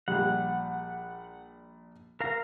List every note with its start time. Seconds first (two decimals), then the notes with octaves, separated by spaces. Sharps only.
0.08 A#1 G3 F#5
2.20 A#4 F5 A#5